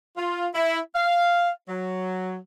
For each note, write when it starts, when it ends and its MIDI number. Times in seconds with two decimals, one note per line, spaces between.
0.17 0.47 65
0.54 0.79 64
0.95 1.50 77
1.69 2.36 54